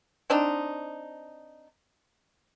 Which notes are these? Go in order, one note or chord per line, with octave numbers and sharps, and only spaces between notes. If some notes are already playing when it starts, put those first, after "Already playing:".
C4 D4 D#4